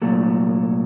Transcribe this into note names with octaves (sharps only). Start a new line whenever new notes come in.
C2 A#2 F#3 A3